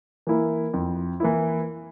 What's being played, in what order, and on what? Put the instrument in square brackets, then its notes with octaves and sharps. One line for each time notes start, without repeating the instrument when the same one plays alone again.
[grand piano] E3 A#3 E4
F2
E3 A#3 E4